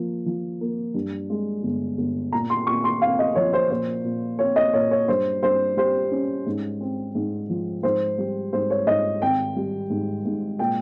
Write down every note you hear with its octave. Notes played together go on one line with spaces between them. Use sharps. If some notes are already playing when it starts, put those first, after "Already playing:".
Already playing: F3 A#3
F3
A#3
G2
G#3
G1
G1
A#2 A#5
C6
A#2 C#6
C6
C4 F5
D#5
F3 C#5
C5
A#2 C5
A#2
C4 C#5
D#5
A#2 C#5
C#5
G2 C5
G2 C5
G3 C5
C#4
G#2
C4
G#2
F3
G#2 C5
G3
G#2 C5
C#5
G#2 D#5
G#1 G5
G3
G#2
G#2
A#2 G5